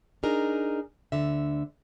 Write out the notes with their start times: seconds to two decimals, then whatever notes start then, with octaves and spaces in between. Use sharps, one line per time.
0.23 D4 D#4 G#4 A#4
1.12 D2 D3 E5